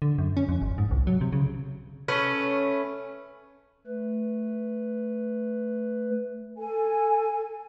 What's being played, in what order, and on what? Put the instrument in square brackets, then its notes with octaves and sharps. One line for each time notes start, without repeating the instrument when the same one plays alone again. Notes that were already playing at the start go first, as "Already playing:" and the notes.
[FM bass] D3
F#2
C#4
F2
G1
G#2
C2
F#3
C3
C#3
[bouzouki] A3 C#4 B4
[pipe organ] A3 B4
[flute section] A4 G#5